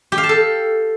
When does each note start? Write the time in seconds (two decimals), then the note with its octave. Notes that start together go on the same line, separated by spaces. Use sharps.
0.12 G4
0.18 F5
0.23 A5
0.29 A4